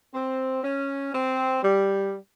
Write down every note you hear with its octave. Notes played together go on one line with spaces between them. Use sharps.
C4
C#4
C4
G3